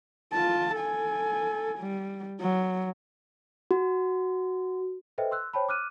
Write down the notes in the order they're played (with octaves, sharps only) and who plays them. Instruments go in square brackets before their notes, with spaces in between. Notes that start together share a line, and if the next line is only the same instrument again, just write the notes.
[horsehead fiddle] F4 A5
A4 G#5
G3
F#3
[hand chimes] F#4
[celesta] A4 B4 C5 D#5 E5 G5
C6 E6 F#6
C5 C#5 G5 A5 B5
D6 F6 F#6 D#7